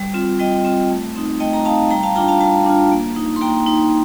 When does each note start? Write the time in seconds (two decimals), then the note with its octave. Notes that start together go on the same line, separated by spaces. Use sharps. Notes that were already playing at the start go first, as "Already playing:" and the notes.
Already playing: G3
0.14 C4 F4
0.39 G3 D#5 G5
0.65 C4 F4
0.90 A3
1.16 C4 D#4
1.40 A3 D#5 G5
1.53 A#5
1.65 C4 F5 A5
1.69 D#4
1.91 G3 G5 A#5
2.03 F5 A5
2.16 D4 F4 G5 A#5
2.28 F5 A5
2.41 G3 F5 A5
2.66 D4 F4
2.92 A#3
3.16 D#4
3.36 C6
3.41 A#3 G5 A#5
3.66 D#4